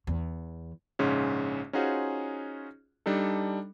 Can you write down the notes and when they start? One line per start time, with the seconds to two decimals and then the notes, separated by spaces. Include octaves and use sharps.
0.07 E2
0.99 A#1 G#2 C#3 C#4
1.73 C#4 D#4 F4 F#4 G#4 C5
3.06 G3 D4 D#4 A4